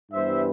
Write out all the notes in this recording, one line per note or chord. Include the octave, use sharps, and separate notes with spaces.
G2 E3 G3 B3 C5 E5